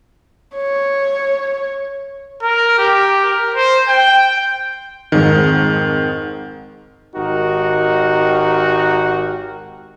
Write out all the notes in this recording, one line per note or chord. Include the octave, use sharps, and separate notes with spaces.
C#5
A#4
G4
A#4
C5
G5
F2 G#2 D#3
G#1 D#4 F#4 G4 A#4